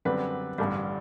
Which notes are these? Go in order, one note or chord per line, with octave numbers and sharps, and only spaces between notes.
F#2 D3 G3 C4 B4
A1 G2 D3 G3